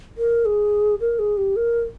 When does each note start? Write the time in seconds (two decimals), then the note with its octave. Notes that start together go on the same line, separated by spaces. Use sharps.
0.18 A#4
0.45 G#4
1.00 A#4
1.19 G#4
1.37 G4
1.56 A#4